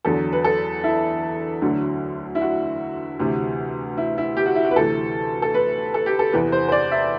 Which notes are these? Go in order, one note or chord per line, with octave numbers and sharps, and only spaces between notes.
E2 D3 F#3 A4
B4
A4
E4
D2 D3 F#3
E4
F#4
D2 C3 E3
E4
E4
G4
F#4
E4
F#4
B4
D2 C3 E3 A4
A4
B4
A4
G4
A4
E2 C3 E3 B4
C5
C5
D5
E5